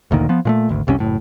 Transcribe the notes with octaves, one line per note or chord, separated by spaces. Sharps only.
F#1 D2 A#2 D#3
F3 B3
A#2 G#3 A3
G#1 D2
F1 C2 C3 C#4
F#1 A2